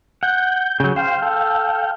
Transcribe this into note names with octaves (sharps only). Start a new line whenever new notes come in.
F#5 G6
C#3 F#3
C5 F5 G5
A4